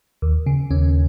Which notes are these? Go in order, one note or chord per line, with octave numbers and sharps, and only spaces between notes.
D#2
C#3
D#2 C#4